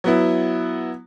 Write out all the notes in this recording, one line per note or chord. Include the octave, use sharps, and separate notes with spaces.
F#3 B3 E4